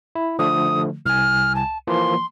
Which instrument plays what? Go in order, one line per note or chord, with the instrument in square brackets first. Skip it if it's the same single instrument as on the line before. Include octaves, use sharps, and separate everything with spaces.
[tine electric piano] E4
[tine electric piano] D3 F3 A3 [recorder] D#6
[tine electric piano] C2 G#5 [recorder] F6
[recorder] A5
[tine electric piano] E3 F3 A#3 [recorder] C6